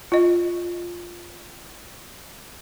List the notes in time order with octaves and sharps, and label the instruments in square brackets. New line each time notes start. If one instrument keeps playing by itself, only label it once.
[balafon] F4 D#5